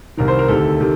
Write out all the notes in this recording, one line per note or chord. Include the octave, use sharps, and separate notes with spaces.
C2 C3 D#3 A#4
C5
A#4
D2 C3 D#3 A4
C3 D#3